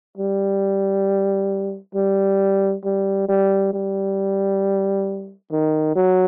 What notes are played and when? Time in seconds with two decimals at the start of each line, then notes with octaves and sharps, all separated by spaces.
0.18 G3
1.95 G3
2.85 G3
3.29 G3
3.73 G3
5.52 D#3
5.96 F#3